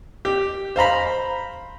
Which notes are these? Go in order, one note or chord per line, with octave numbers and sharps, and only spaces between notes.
G4
C5 F5 A#5 B5